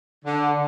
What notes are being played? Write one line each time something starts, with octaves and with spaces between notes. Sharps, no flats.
D3